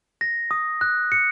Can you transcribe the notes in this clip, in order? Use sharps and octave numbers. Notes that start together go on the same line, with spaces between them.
A#6
D#6
F#6
C#7